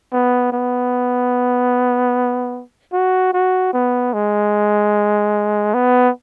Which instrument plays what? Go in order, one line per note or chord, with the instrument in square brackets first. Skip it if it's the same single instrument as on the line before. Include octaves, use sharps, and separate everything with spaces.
[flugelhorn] B3
B3
F#4
F#4
B3
G#3
B3